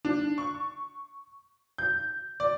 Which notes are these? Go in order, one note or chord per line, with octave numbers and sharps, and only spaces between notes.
D4
C#6
G6
D5